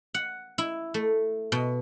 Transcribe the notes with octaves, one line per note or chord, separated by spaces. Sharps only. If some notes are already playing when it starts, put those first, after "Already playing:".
F#5
E4
A3
B2